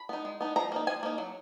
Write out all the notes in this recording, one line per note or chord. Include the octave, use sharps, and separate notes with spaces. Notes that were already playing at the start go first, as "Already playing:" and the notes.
Already playing: B5
B3 D#4
G#3
B3 D#4
F3 A#5
A#3 D#4
F3 G#5
A#3 D#4
F#3